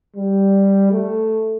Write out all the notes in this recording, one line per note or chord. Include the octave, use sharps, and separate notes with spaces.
G3
A3